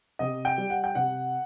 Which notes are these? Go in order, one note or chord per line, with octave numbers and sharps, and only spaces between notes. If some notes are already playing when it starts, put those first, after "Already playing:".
C3 D#5
G5
G3
F#5
G5
C3 F#5